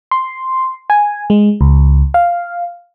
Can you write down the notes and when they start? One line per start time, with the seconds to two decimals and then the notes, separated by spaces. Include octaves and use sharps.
0.11 C6
0.90 G#5
1.30 G#3
1.61 C#2
2.14 F5